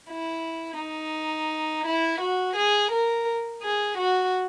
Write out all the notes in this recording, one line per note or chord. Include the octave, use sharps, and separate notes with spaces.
E4
D#4
E4
F#4
G#4
A#4
G#4
F#4